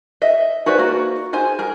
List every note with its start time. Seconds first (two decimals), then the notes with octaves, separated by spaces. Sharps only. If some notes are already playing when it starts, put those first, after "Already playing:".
0.22 D#5 E5
0.66 F#4 G#4 B4 C5 D5
0.78 A#3 F#4
1.33 G#4 C5 G#5
1.59 G#4 A#4